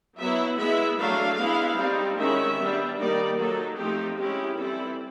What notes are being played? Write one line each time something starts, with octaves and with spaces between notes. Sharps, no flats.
F#3 B3 E4 E5
G#3 B3 E4 E5
F#3 A3 D4 F5
G#3 B3 E4
G3 C4 D#4
D#3 G#3 C#4 E4 E5
G3 B3 D4
D#3 G3 A#3 D#4 D5
F#3 A#3 D#4 A4
F3 A3 C4 D#4 G4
G#3 C#4 E4 G4
E3 G3 C4 E4 A4